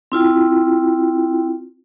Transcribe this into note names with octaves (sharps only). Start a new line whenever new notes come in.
C4 E4 F4 G5